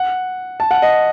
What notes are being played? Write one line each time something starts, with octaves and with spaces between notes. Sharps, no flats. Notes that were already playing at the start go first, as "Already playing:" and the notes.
Already playing: F#5
A5
F#5
D#5